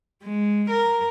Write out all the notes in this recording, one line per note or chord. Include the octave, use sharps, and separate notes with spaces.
G#3
A#4